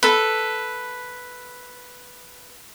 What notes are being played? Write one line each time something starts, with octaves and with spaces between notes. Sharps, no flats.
A4 B4